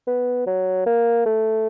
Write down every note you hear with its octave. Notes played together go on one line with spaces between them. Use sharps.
B3
F#3
A#3
A3